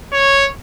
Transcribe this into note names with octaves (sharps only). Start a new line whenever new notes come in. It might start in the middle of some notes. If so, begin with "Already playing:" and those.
C#5